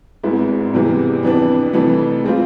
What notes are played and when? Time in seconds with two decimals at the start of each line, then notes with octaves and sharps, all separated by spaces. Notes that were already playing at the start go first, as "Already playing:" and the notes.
0.23 G#1 G#2 G#3 B3 E4
0.73 E2 C3 E3 G#3
1.23 F2 E3 B3 D4
1.73 F1 F2 E3 A3
2.25 G#3 C4 F4